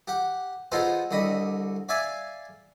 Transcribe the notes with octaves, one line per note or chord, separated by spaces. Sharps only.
G4 F#5
B3 D#4 F4 G#4 A4 C5
C2 D3 D#5 B5
D5 E5 F5 G#5 D6